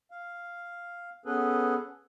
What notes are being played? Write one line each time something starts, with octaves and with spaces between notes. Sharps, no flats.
F5
B3 C#4 G#4 A4 B4